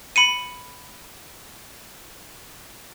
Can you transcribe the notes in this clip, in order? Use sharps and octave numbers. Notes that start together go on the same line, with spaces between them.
B5 C#7 D#7